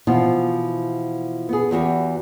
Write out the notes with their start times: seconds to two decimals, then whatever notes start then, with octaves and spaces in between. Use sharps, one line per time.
0.07 B2 E3 F3 E4 F4
1.49 B3 G#4
1.71 E2 E3 F#4 G4